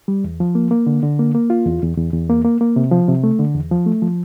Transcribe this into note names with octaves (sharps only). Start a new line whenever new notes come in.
G3
E2
F3
A#3
A#3
D3
D3
A#3
A#3
F4
E2
E2
E2
E2
A#3
A#3
A#3
C3
F3
C3
A3
D3
E2
F3
A3
F3